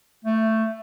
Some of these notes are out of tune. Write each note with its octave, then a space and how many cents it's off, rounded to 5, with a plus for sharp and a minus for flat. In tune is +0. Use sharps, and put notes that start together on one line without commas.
A3 +10